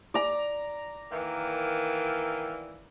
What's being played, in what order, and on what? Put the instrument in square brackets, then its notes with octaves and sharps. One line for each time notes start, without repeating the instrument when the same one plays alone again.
[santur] D5 A#5
[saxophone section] D#3 E3 A#3